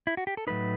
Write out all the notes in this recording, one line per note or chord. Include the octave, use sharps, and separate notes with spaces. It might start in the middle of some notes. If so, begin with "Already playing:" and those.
E4
F#4
G4
A4
A2 F#3 A3 D#4 B4